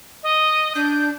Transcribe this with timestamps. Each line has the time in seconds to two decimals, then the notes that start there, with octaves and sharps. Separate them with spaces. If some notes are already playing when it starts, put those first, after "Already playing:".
0.23 D#5
0.75 D4 G6